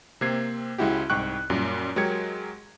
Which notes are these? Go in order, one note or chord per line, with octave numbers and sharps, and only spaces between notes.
C3 A#3 C4 G#6 C7
C#2 G#3 C#4 E4 F#4 G4
C2 G#2 G5 C#6 F#6
F#2 A#2 G3
F#3 G#3 G4 A#4 G#6 C#7